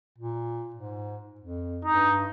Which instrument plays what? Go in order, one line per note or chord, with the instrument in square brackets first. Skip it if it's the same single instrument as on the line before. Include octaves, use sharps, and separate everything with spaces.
[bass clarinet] A#2
G#2
F2
[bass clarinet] G2 [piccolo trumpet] D#4